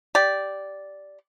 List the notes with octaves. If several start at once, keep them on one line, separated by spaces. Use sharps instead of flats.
G4 D5